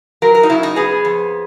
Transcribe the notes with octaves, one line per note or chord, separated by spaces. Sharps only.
F#3 A#4
A#4
D#4
C#3 E4
D#4
B3 G#4
F2